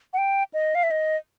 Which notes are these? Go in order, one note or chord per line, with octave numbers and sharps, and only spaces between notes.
F#5
G5
D#5
F5
E5
D#5